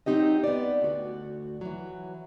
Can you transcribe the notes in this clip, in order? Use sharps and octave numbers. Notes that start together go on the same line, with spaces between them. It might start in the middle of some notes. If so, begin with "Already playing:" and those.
F#3 G#3 C4 D#4 G4 D#5
B3 D5
D2 F#4
E3 F#3